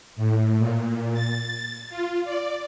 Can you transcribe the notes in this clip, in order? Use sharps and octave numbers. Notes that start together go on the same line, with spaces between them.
A2
A#2
A6
F4
D5